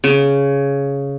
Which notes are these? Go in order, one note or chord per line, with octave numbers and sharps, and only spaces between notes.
C#3